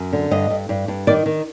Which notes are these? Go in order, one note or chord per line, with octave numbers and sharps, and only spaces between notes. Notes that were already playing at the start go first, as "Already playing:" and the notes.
Already playing: F#2
D3
G2 D#5
G2
G2
G2
D#3 D5
D#3